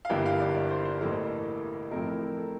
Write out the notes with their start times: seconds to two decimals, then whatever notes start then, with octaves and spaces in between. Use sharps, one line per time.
0.05 F5
0.10 G1 G2 E3 A#3 E4 G5
0.26 F5
0.40 D5
0.55 D5
0.70 C5
0.85 C5
1.01 A1 A2 E3 A#3 A4
1.91 A2 F3 A3 C4 E4 A#4
2.07 A#4
2.22 A4
2.37 A4